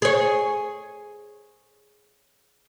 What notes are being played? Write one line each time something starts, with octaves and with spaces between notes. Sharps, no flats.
G#4 C#5